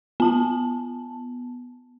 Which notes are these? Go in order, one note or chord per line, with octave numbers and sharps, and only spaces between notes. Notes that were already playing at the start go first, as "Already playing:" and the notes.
B3 A5